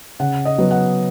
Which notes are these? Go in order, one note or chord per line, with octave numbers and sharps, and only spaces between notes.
C#3 F#5
D#5
F#3 B3
F#5